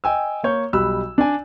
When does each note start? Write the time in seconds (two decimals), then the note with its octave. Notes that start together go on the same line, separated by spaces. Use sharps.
0.04 D#5 G5 G#5 E6
0.43 A#3 C#5 G6
0.73 B1 G3 B5 E6 F#6
1.18 D4 D5 G#5